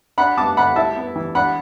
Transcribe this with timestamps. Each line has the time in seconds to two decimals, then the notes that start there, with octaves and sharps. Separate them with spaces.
0.18 D4 F#5 B5
0.38 B3 A5 D6
0.57 D3 F#5 B5
0.76 E4 E5 A5
0.96 B3
1.16 E3
1.35 D4 F#5 B5